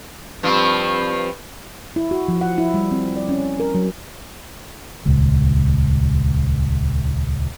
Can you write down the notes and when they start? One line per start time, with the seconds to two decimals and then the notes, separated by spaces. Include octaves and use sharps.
0.43 G2 F3 C4
1.96 E4
2.11 F#4
2.28 F3
2.41 F#5
2.58 E4
2.74 G3
2.91 C4
3.16 D5
3.29 C#4
3.60 A#4
3.75 F#3
5.06 D#1 C#2